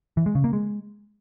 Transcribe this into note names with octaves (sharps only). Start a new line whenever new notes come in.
E3
G#3
C#3
A#3
G#3